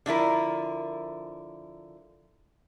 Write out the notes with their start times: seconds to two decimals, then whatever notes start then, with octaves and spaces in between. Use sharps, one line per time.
0.06 D3 F3 E4 A#4